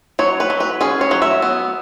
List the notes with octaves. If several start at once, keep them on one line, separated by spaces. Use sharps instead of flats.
F#3 C#5
B4
F#3
B4
C#4 G#4
C#5
F#3
E5
B3